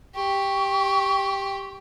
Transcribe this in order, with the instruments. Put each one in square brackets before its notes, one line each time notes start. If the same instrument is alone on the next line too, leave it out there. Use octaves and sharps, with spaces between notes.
[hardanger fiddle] G4 [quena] C#6